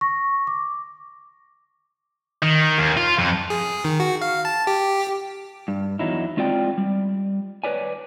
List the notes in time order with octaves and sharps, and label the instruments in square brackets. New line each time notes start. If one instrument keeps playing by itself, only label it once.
[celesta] C#6 A#6
D6
[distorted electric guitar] D#3
D#2
F4
F2
[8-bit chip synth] G#4
D#3
F#4
F5
A5
G4
[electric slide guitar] G2
E2 F#3 D#4 E4
G#3 C4 F4 D5 G5
G3
B4 C#5 D5 G#5